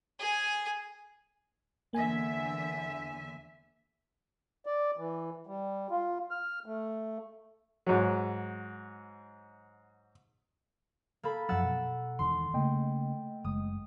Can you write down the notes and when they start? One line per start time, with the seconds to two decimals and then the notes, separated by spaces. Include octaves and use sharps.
0.19 G#4 G#5
1.93 E2 D3 A#3 E5 G#5
4.66 D5
4.97 E3
5.47 G3
5.91 F4
6.31 F6
6.66 A3
7.86 G#2 F#3
11.23 A#3 A4 B5
11.49 F#2 F3 F#3 F#5 E6 A6
11.63 B2
12.19 E1 E2 D#3 C6
12.54 C#3 A3 A#3 D#5 G5
13.45 F#1 G#3 D#6